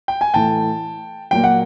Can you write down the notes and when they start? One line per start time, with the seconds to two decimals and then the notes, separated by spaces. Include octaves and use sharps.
0.08 G5
0.21 G#5
0.34 A2 E3 A3 G5 A5
1.31 A#2 F#3 A#3 G5
1.44 F#5